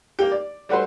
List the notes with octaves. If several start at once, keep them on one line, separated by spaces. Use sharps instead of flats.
A#3 G4
D5
G3 A3 F#4 B4 C5